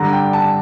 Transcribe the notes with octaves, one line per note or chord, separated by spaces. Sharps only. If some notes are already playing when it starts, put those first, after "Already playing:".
Already playing: G2 D3 A#5
G5
A5